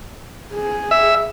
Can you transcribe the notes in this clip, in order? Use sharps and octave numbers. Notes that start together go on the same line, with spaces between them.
G#4
E5